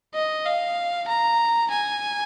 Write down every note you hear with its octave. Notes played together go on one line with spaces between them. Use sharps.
D#5
F5
A#5
G#5